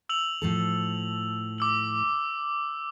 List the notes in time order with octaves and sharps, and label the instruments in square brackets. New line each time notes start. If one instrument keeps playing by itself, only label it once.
[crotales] E6 F7 F#7
[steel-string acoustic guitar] A2 F3 A4
[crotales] D6 E6 F#7